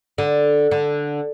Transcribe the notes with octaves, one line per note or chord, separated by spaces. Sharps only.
D3
D3